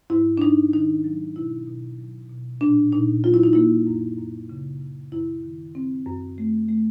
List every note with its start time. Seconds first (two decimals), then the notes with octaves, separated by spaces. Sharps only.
0.10 G#2 E4
0.38 D4
0.41 G#2 D#4
0.73 D#3 D#4
1.04 F#3
1.36 B2 E4
1.67 B2
1.99 F#3
2.30 B2
2.61 A#2 D4
2.92 A#2 D#4
3.24 F#3 F4
3.34 E4
3.43 D#4
3.53 A#3 E4
3.87 F#2
4.18 F#2
4.49 C#3
4.81 C#3
5.12 F#2 E4
5.44 D#3
5.75 C4
6.06 F#2
6.38 A3
6.69 A3